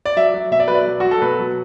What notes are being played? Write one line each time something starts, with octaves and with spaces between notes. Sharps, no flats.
D5
F#3 E5
F#3
B2 E5
D5
F#3 B4
D5
F#3
F#3 F#4
A4
B2 B4
F#3